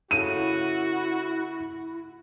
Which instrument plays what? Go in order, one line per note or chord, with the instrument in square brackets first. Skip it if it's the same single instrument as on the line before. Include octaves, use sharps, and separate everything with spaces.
[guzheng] C#3 A3 [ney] E4 [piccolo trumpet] F#4 [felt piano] D#7